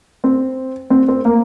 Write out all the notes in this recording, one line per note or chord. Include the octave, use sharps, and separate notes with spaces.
C4
C4
C4
A#3